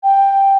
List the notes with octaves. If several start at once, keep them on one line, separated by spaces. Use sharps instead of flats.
G5